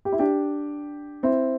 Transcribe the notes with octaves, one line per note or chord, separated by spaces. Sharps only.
G4
E4
D4 G4
C4 E4